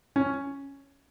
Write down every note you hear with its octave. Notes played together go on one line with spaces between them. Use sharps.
C#4